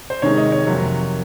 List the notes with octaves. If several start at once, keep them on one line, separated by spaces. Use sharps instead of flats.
C5
C3 D#3 G#3 C#5
D#5
C#5
F2 C3 F#3 A#3